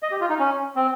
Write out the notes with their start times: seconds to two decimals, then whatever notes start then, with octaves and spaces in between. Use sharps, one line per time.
0.03 D#5
0.11 G4
0.21 F4
0.30 D#4
0.39 C#4
0.76 C4